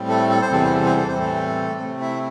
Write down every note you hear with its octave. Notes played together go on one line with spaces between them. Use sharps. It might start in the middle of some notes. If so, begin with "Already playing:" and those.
Already playing: A2 G3 C4
A3 A4
A4
C5
E2 C3 E3 G3 C4 A4
C5
A4
C5
A4
C5
A2 E3 G3 A3 C4 A4
C3 A3 C4
E4 E5